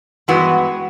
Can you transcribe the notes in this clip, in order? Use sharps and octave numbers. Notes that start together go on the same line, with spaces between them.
G2 E3 G#3 B3 F#4